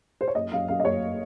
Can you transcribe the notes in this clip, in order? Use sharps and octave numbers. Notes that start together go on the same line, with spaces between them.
C5
C#5
F#1 D#5
F#2 F5
F#2 F5
D#5
F#1 C#5